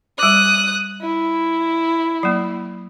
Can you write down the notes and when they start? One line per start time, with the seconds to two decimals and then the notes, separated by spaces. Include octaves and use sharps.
0.19 G3 D6 D#6 F#6
1.02 E4
2.23 F#3 A#3